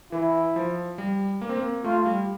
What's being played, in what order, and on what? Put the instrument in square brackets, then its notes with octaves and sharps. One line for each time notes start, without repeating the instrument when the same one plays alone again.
[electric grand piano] E3 [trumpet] E4
[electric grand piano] F3
G3
A#3
C4
A#3
[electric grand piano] A3 [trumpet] F4
[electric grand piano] G3